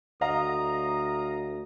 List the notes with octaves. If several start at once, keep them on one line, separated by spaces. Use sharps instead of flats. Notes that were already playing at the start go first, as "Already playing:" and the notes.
D2 D#5 F5 A#5 D#6